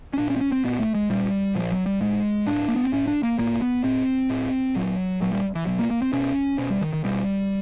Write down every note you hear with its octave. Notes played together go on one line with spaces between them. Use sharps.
C#4
A#2 D4
C#4
C4
C#4
C4
A#2 B3
A3
G#3
A#2 G3
A#2 F3
F#3
G3
A2 G#3
A2 D4
A#3
B3
C4
A2 C#4
D4
A#3
A2 A#3
B3
A2 C4
A2
A#2 F#3
A#2 F#3
G3
E3
B2 F#3
A#3
A#3
C4
B2 C#4
B2 C#4
G3
D#3
D#3
B2 G3